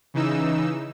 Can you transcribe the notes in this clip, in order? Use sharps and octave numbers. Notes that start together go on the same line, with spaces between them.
C#3 E3 D#4 E6